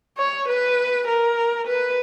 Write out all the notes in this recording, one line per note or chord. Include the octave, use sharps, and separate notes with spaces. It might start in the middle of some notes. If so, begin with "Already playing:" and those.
C#5
B4
A#4
B4